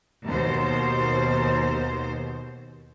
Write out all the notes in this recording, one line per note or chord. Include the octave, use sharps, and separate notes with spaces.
D#2 B2 C5